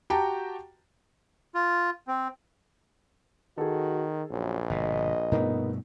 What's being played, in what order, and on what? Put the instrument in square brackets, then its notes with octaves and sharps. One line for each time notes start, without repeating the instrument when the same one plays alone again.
[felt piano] F#4 G4 G5 A5 A#5
[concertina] F4
C4
[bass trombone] D#3 [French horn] F#4 [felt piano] G#4 A4
[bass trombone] A#1 [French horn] F#2
[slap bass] G1 B2 [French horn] D#5
[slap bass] G2 B2 A3 [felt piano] B3 D#4 A#4